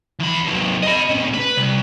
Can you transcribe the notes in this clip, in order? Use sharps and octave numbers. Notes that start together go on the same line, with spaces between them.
E2 B5
C3 F#3
D#5 B5
A#2 C#3
B4
C2